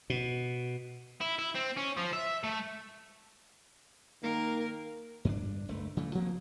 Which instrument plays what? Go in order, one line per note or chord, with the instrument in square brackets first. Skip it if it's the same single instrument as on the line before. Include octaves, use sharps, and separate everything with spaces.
[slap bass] B2
[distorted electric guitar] E4
E4
C4
C#4
F3
E5
A3
[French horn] D#3 [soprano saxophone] A#3 [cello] A#4
[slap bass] G2 C4 D4
F#1 C#2 A3
C#3 E3 A3
F3 A#3 C4